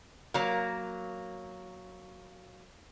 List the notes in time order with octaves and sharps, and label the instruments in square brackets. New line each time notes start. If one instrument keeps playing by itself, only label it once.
[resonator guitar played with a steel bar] F#3 A#3